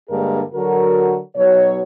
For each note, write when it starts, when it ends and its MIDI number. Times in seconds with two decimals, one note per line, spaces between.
0.10 0.41 43
0.10 0.41 50
0.10 0.41 56
0.10 0.41 58
0.10 0.41 68
0.10 0.41 70
0.54 1.18 50
0.54 1.18 54
0.54 1.18 66
0.54 1.18 69
0.54 1.18 70
1.36 1.83 47
1.36 1.83 54
1.36 1.83 63
1.36 1.83 73